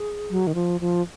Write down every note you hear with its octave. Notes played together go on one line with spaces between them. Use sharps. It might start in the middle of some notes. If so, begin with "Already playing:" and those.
Already playing: G#4
F#3
D#3
F3
F3